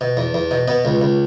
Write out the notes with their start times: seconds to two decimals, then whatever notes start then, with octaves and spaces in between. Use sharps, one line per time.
0.01 B2
0.17 E2
0.34 E2
0.51 B2
0.68 B2 B3
0.85 C#2
1.01 C#2